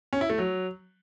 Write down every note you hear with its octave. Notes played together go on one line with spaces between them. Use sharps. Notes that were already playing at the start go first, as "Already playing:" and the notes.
C#4
E4
A3
F#3